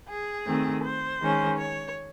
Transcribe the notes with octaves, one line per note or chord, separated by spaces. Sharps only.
G#4
D#3 A3 C4
C5
D#3 G#3 C#4
C#5